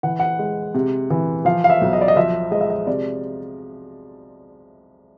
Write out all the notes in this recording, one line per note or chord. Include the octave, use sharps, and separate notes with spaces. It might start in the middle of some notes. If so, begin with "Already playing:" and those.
E3 F#5
F#5
G#3
C3
E3
F3 F5
F5
E5
B1
D#5
D5
D#5
F3 E5
G#3 D#5
E5
D#5
C3 D5